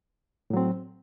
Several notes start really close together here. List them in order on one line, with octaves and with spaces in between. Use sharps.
A2 F#3 C4